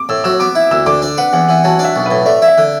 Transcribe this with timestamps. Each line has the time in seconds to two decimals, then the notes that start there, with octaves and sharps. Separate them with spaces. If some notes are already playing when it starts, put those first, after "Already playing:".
Already playing: D6
0.09 A2 E6
0.24 F#3 E6
0.40 B3 D6
0.55 E4
0.71 D2 E6
0.86 D3 D6
1.02 D4
1.17 B4 F#5
1.33 E2 F#5
1.48 E3 F#5
1.64 F#3 A5
1.79 D4
1.84 E5
1.96 B1
2.06 B4
2.10 A2
2.26 A3 D5
2.42 E4
2.48 E5
2.58 D3